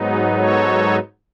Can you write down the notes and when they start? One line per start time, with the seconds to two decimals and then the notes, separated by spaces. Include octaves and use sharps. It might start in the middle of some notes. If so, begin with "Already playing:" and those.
Already playing: G#2 F#3 B3 D#4
0.08 G#4 B4
0.37 A4 C#5